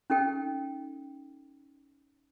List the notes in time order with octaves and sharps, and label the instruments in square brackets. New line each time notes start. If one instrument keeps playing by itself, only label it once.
[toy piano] C#4 D#4 A4 G5